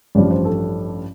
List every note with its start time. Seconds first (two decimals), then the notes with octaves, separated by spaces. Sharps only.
0.15 A1 G2 F3 D5
0.30 C5
0.45 A4